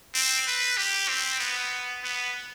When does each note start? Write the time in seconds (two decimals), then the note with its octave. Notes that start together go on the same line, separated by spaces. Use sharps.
0.14 C4
0.47 B4
0.77 G4
1.08 C4
1.40 B3
2.04 B3